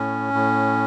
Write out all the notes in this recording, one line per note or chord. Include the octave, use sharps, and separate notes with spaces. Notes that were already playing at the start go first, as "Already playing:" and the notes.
Already playing: A2 C#4
A2